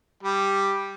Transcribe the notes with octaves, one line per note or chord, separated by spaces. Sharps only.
G3 G4